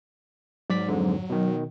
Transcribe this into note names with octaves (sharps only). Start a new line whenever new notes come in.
G#2 F#3 D5 B6
F2 G#2 D3
B2 D#3